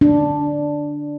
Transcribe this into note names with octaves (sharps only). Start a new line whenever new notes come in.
D4